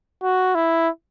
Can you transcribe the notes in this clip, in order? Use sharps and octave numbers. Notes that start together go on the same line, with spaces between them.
F#4
E4